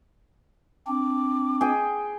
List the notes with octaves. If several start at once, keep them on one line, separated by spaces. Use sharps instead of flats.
C4 D4 D6
G#4 G5